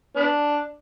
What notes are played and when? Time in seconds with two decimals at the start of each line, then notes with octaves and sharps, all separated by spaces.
0.16 B3 D4